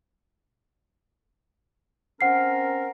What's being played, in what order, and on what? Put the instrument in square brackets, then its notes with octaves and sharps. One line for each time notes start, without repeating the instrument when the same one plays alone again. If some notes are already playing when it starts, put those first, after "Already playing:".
[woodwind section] C4 C#4 A#4 [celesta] F#5 C7